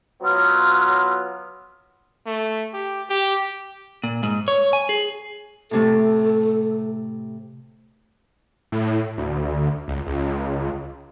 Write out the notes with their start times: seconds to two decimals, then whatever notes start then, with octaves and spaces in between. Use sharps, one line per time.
0.22 F#3 B3 F4 F6
2.26 A3
2.74 G4
3.10 G4
4.04 A#2
4.23 G#2
4.48 C#5
4.73 G#5
4.89 G#4
5.71 A2 C3 A3 A4
8.72 A2
9.18 D2
9.88 C#2
10.07 C#2